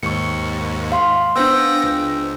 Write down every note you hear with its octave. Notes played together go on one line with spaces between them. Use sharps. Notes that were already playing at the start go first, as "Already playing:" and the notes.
D#2 G#2 C#6 C#7
F5 C6
B3 D4 C5 G5 E6 A#6
C#2